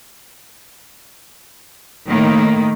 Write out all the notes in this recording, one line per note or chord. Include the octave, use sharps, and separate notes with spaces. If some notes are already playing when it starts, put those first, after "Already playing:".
A2 D#3 A#3